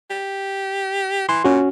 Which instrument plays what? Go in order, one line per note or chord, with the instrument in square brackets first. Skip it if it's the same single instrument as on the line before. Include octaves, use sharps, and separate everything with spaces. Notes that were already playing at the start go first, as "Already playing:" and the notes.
[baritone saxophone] G4
[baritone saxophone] E3 [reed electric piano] C6
[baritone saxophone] A#2 [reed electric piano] C#4 F#4